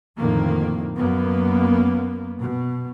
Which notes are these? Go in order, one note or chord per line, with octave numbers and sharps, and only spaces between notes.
F2 A2 D3 D#3 A#3
F#2 A#3 B3
B2